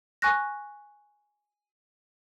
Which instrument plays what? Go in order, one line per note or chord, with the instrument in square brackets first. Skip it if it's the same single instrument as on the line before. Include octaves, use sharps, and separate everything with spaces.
[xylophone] G#5 C#6 F#6 A#6